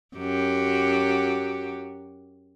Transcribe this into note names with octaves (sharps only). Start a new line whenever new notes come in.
F#2 F#4 G4